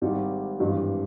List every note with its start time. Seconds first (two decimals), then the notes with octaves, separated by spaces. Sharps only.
0.02 G#1 G#2 G3
0.60 G#1 G2 E3